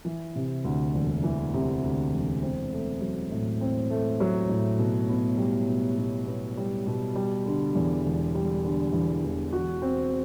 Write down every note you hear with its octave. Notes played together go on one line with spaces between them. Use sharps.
E3
C3
D2
E1
E3
C3
D2
E1
C4
A3
F#3
A2
C4
A3
F#3
A2
B2
B3
G3
B2
B2
B3
G3
B2
G3
D3
E2
E1
G3
D3
E2
E1
F#4
C4